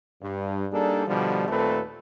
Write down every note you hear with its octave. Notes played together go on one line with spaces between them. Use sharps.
G2
G3 A#3 D4 D#4 G#4 A4
B2 D3 F3 G3
D#2 A#2 A3 C4 A4 B4